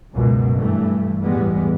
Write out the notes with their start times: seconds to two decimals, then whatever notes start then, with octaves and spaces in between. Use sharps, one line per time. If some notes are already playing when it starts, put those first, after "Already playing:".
0.12 C#2 F#2 B2
0.56 G2 E3 A3
1.23 E2 A2 E3 G3 G#3 B3